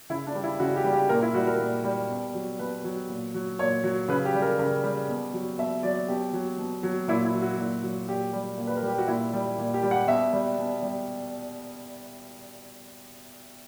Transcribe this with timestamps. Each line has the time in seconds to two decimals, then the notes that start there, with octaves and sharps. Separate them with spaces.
0.10 C#3 E4
0.27 D4
0.35 G3
0.43 E4
0.60 C#3 F#4
0.76 G4
0.84 G3
0.93 G4
1.09 A#2 A#4
1.22 E4
1.34 G3 F#4
1.47 A#4
1.59 A#2
1.84 G3
2.09 B2
2.34 F#3
2.59 B2 B4
2.84 F#3
3.09 A#2
3.34 F#3
3.59 A#2 C#5
3.84 F#3
4.08 C#3 B4
4.25 G4
4.34 G3
4.42 A#4
4.59 C#3 A#4
4.84 G3
5.09 B2
5.34 F#3
5.59 B2 E5
5.83 F#3 D5
6.08 B2 G4
6.33 F#3
6.59 B2
6.83 F#3
7.08 A#2 E4
7.25 E4
7.34 F#3
7.42 F#4
7.58 A#2
7.83 F#3
8.08 A#2 G4
8.33 G3
8.57 A#2
8.67 B4
8.77 A#4
8.83 G3
8.88 G4
8.98 F#4
9.07 A#2 E4
9.33 G3
9.58 A#2
9.74 G4
9.83 G3
9.91 F#5
10.08 B2 E5
10.33 G3
10.58 B2
10.82 G3